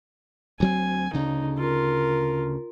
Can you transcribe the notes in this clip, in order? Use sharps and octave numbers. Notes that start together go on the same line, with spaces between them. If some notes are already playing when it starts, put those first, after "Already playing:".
D2 F#3 C4 G#5
D2 C#3 D#4
F4 A#4